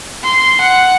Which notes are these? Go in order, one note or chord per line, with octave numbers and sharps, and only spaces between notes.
C6
F#5